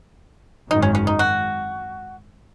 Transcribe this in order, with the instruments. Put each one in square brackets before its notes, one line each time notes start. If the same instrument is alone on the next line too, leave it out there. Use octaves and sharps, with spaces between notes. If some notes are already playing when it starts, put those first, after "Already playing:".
[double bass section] G#1 F#2 D#3 [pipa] D#4
[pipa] C#4
C#4
D#4
F#4